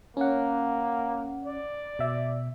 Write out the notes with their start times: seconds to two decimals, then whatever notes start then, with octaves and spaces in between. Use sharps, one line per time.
0.17 A#3 C#4 F#5
1.45 D5
1.99 B2 E5